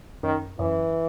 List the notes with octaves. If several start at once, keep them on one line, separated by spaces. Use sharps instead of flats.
F#2 D#3
F#2 E3